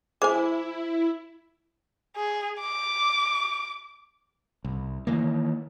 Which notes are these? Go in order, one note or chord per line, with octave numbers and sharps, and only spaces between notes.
E4 G#4 C5 G#5 D6
G#4
D6
C2
D#3 E3 A#3